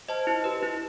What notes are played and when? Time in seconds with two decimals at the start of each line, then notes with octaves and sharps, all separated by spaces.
0.08 C5 D#5 A5
0.27 E4
0.44 G4 B4
0.63 E4